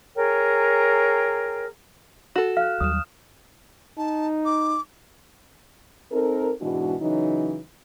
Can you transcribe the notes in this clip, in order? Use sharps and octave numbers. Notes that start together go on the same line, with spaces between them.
G#4 A#4 C#5 G5
F#4 A4 E7
F5 F6 F#6
D#2 F#3 G3 D#6 F6 E7
D#4 A5
D6
C4 D#4 A4 A#4
G#2 B2 E3 G#3 D4 F#4
C#3 E3 F#3 D#4